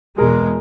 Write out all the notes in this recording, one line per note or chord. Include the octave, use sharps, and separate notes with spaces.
E2 B2 G#3 G#4 A#4